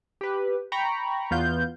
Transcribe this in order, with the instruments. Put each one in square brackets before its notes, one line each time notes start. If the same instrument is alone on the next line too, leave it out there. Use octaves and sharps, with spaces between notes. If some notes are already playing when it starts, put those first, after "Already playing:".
[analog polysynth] G4 B4
G5 A#5 B5 C#6
E2 B3 F4 F5 G6